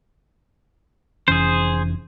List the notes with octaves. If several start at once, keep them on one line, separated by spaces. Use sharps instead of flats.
F1 E3 C#4 G#4 C5